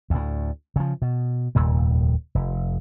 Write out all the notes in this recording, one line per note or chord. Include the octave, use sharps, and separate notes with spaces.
D2 A2
C#3 F3
B2
F1 D#2 A#2 G3
F1